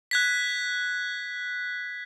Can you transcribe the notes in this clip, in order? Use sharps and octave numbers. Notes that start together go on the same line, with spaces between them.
F#6 G#6 B6